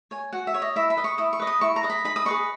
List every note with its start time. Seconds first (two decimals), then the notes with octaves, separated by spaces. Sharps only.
0.11 C#5 G#5
0.33 F#4 F#5
0.47 E5
0.54 C#5
0.62 D#5
0.76 E4 E5
0.90 B5
0.97 B4 D#5
1.04 C#6
1.18 E4 D#6
1.33 C#6
1.39 B4 D#5
1.47 D#6
1.61 E4 C#6
1.76 A#5
1.83 B4 D#5
1.90 B5
2.04 D#4 B5
2.16 D#6
2.26 G#4 B4 D#5 C#6